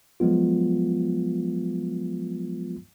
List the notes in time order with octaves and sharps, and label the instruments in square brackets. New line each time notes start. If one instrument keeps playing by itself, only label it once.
[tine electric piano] F3 F#3 G#3 B3 F4